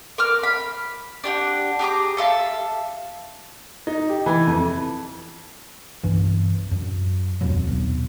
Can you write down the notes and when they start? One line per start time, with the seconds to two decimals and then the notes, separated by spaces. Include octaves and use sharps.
0.18 A#4 D6 F6
0.43 B5
1.24 D4 G4 F#5
1.79 G4 G#4 A#5 D6
2.17 A4 E5 F5 A5
3.87 D#4
4.09 G4
4.26 E3
4.47 F2
6.04 B1 G2 E3
6.71 F#2
7.41 D#1 F2 B2 F#3
7.67 D#1 B1